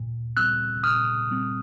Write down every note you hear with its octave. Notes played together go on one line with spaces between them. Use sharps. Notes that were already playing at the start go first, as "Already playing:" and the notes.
Already playing: A#2
G3 C4 E6 F#6
A#2 D#6 F6
G3 C4